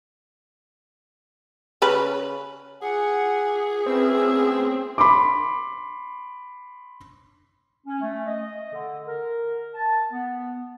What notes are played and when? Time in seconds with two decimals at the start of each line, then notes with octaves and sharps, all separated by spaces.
1.82 C#3 C#4 B4
2.82 G#4 F#5 G#5
3.86 A3 C4 C#4 B4 E6
4.31 B3
4.98 B5 C6 D6
7.87 C#4
8.00 A3
8.26 D#5
8.72 D3
9.05 A#4
9.74 A5
10.12 B3